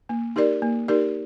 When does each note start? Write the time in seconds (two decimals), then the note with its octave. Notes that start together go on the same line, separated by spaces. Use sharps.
0.09 A#3
0.36 D#4 G4 A#4 D5
0.62 A#3
0.88 D#4 G4 A#4 D5